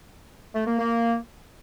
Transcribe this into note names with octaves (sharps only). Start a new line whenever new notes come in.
A3
A#3
A#3